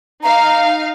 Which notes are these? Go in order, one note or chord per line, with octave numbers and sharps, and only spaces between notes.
D#4 F5 A#5